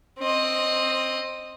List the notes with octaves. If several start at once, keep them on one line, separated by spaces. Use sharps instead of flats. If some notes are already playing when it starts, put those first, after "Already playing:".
C4 D#5